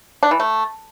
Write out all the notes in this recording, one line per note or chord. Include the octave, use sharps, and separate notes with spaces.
D4
E3
A3